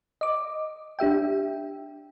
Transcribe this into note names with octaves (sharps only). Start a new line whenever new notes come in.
D#5 D6
D4 G4 E5 G5